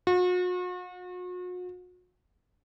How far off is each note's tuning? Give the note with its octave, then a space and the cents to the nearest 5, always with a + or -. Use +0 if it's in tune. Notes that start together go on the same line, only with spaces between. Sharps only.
F#4 -40